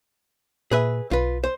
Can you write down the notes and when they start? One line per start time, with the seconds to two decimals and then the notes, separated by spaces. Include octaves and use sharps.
0.71 A#2 G#4 B4 E5
1.11 B1 F4 B4
1.44 C5